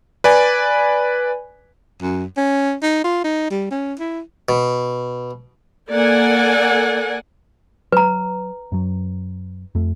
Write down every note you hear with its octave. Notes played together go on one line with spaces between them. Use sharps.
B4 D5 G#5
F#2
C#4
D#4
F4
D#4
G3
C#4
E4
B2
A#3 A4 D5 F#5 G#5
F#3 B4 A#5
F#2 F#3
F2 A3